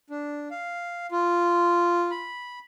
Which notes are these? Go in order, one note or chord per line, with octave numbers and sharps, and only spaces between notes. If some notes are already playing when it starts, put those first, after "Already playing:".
D4
F5
F4
B5